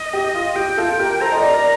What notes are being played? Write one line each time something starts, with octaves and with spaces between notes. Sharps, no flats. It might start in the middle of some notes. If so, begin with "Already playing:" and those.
Already playing: D#5
G4
F4
G4 G5
F4 A4
G4 A#4
A4 C5 A#5
D#5
A#4 D5
A#4 D5